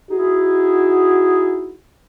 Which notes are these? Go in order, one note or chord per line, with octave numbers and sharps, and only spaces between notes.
D#4 E4 F#4 G#4